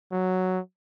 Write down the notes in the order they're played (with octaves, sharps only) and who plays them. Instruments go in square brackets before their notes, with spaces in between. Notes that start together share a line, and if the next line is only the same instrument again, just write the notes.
[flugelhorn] F#3